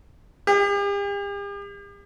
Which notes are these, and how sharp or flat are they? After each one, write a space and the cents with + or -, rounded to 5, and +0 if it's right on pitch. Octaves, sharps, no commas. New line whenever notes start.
G4 +45